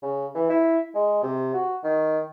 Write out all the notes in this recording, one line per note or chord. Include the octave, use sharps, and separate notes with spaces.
C#3
E3
E4
G#3
C3
F#4
D#3